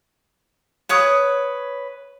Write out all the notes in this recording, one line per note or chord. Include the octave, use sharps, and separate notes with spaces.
B4 C#5 D#6